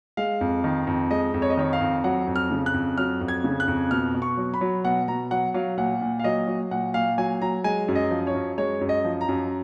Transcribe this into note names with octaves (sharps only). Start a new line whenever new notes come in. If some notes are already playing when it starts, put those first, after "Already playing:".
G#3 F5
F2
D#3
F2
G#3 D#5
F2
C#5
D#5
D#3 C#5
F5
F2
F#3 F#5
F2
F6
C#3
F#6
F2
F#3 F6
F2
G#6
C#3
F#6
F2
B2 F6
B2
C#6
F#3
B5
F#3
B2 F#5
B2 A#5
F#3 F#5
F#3 F5
A#2 F#5
A#2
F5
F#3 D#5
F#3
A#2 F#5
A#2 F5
F#3 G#5
F#3 A#5
G#3 G#5
F#2
D#5
F3
C#5
F#2
G#3 C#5
F#2
D#5
F3
A#5
F#2